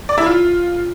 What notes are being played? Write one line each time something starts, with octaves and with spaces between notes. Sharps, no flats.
D5
E4
F4